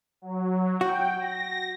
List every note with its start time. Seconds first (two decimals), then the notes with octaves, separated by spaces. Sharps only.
0.22 F#3
0.81 F#4 G5
1.18 A#6